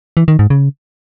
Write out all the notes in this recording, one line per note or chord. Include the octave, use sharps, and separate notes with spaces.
E3
D#3
G#2
C#3